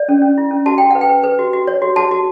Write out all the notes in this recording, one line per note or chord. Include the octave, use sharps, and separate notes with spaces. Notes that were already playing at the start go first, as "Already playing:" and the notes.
Already playing: D5
C#4
C#4
E4
C#4
F#4 A5
F#4 G5
B4 F#5
G5
B4
B4
F#4
F#4
C#5
F#4
F#4 A5
F#4